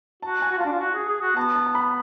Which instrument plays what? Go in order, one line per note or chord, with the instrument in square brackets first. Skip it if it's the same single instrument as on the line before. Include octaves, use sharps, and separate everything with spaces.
[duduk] F#4 [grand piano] A5
[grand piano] G#5
[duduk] F#4
F4
[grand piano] A5
[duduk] D4
F4
F#4
G#4
G#4
F#4
[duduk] B3 [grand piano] A5
[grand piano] A5
A5
B5